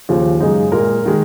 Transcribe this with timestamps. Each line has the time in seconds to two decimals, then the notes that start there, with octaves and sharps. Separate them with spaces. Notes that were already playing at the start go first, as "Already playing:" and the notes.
0.09 D#2 C#3 F3
0.40 F#2 C#3 G#3 D#4
0.72 A#2 G#3 A#4
1.05 D#3 G#3